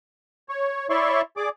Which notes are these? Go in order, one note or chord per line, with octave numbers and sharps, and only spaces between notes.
C#5
E4 C#5 D5 E5 C6 C#6
G#4 D5 D6